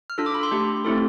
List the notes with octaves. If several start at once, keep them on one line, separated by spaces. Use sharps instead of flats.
F6
D4 F4 A4 E6
D6
B5
C6
A3 D4 G4
A3 C4 E4 A4